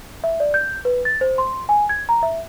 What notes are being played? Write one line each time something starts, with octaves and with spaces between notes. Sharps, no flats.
E5
D5
G6
B4
A6
C5
C6
G#5
G#6
A#5
E5